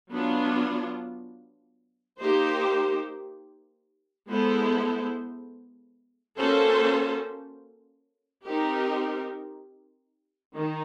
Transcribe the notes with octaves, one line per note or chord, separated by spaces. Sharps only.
F#3 B3 D4 F4
A#3 D#4 G4 C5
G#3 B3 E4 A4 C5
A#3 C#4 F#4 A4 C5
C4 D#4 G4 A#4
D#3